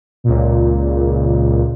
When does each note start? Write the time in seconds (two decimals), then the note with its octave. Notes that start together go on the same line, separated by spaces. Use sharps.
0.24 C#2 A#2